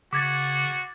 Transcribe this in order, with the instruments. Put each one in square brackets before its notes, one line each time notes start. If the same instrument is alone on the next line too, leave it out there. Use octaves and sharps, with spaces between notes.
[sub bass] C#3 [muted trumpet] F#4 [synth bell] D6 G#6 A6